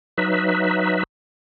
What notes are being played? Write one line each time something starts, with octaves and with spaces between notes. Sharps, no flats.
F#3 D#4 B4 E5